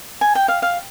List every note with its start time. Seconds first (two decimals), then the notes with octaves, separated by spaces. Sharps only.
0.21 G#5
0.35 G5
0.48 F5
0.62 F5